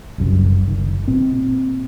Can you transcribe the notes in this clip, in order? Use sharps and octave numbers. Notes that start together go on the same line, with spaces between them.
F#1 C2 F#2
F#1 D#3
A#2 C4